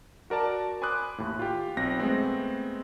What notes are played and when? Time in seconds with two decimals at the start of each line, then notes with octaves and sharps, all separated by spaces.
0.30 F#4 A#4 D5 A5
0.82 G#5 B5 C6 D6 D#6 F#6
1.18 D#2 A2
1.39 F4 G4
1.77 B1 C4 A#6
2.00 G#3 A3 B3 C4